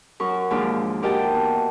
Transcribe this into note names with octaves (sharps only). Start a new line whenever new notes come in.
F#2 A#4 C#6
D#2 G#2 F3 D4 F4 A#5
F#4 G4 A#4 D#5 G5 A5
E2